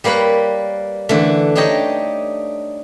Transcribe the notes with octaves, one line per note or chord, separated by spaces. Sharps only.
G3 A#3 B4 C#5 B5
D3 E3 A3
D4 D#4 G4 C#5 D#5